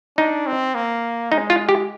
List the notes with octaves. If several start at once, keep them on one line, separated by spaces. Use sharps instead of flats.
D4 D#4
C4
A#3
G#3 D#4
F4
G4